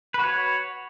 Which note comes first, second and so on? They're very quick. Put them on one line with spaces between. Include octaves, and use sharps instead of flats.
B4 F#4 C#5